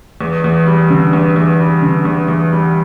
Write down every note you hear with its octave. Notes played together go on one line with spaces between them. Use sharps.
E2
E2
G3
D3
E2
E2
G3
D3
E2
E2
G3